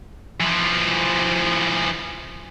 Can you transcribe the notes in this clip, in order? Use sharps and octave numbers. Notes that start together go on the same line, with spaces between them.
E3 F3